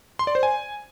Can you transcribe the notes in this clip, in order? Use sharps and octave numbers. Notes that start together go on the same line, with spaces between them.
C6
D5
C5
G#5